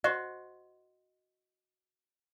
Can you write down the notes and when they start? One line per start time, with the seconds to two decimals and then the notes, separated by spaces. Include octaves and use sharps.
0.04 F#4 C5 D#5